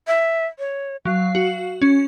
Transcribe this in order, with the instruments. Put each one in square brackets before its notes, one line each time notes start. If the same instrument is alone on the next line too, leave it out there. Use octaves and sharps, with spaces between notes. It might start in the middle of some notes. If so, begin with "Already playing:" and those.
[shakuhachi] E5
C#5
[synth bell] F#3 [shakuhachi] F5
[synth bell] F#4
C#4